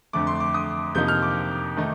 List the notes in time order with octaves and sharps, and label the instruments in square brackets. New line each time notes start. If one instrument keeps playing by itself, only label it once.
[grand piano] F2 D3 A3 D6
C6
D6
D#6
F2 C3 F3 A#3 D#4 G6
F6
D6
D#3 A3 D#4